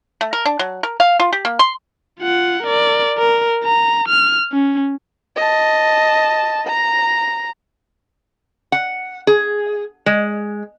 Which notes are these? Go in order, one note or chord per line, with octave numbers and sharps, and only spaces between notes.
A3
A#4
D4
F#3
A#4
F5
F4
G4
A#3
C6
F4 F#5
A#4 D5
A#4
A#5
F6
C#4
D#5 A5
A#5
F#5
G#4
G#3